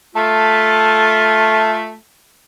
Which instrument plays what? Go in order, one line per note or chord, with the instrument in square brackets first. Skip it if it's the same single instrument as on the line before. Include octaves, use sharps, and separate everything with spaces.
[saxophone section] A3 [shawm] F4 [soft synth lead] A5